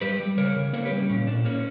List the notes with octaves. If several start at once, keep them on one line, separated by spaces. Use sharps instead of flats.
G3 G4 B4
G3
C#3 A#4 C#5
C#3
A#3 A#4 C#5
G4 B4
G3
C#4
A#2 C#4
A#2 D4
A#3 C#4